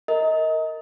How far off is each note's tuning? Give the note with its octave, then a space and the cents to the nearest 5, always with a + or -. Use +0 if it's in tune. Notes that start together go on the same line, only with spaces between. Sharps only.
A#4 -15 D#5 +30